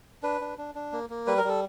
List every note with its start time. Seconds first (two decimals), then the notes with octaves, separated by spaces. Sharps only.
0.23 D4 B4
0.41 D4
0.58 D4
0.75 D4
0.92 A#3
1.10 A#3
1.27 G3 B4
1.38 A#4
1.44 G3 A4